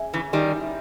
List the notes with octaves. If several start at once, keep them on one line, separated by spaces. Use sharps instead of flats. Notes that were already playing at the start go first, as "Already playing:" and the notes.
Already playing: C#4 G#4 E5
C#3 E3 C#5
D#3 G3 C#4
E4